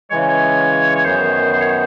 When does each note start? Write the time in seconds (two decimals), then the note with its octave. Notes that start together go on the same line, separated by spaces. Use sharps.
0.10 C#3 E3 G#3 C#5
0.28 C#5
0.95 C#5
1.05 F#2 D#3 F#3 B3 C5
1.53 C5
1.61 C#5
1.70 C5